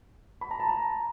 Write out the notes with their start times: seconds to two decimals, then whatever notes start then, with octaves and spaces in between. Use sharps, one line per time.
0.41 B5
0.51 A#5
0.60 A5
0.69 A#5